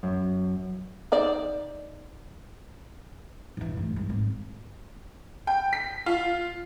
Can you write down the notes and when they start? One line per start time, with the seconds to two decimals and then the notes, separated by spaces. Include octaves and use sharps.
0.03 F#2
1.12 D#4 C5 D5
3.57 G2 E3
3.77 G2 A3
3.96 G#3
4.09 G#1
5.47 G5
5.73 B6
6.06 F4